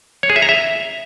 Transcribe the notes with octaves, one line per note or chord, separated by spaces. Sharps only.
C#5
G#4
E5
A#5
E5